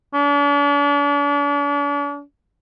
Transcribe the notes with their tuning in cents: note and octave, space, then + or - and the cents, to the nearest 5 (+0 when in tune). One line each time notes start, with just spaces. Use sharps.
D4 -40